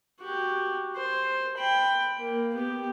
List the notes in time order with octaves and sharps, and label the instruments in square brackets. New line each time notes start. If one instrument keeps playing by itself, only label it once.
[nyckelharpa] F#4 G4
C5
G5 B5
A#3
B3 G4